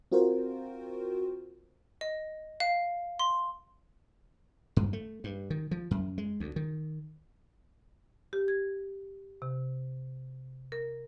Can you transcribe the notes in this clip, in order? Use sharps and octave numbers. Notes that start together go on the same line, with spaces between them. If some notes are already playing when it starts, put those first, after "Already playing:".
C4 F4 F#4 A#4 C5
D#5
F5
C6
G2
A3
G2
D#3
F3
F#2
G#3
D2
D#3
G4
G#6
C3
A#4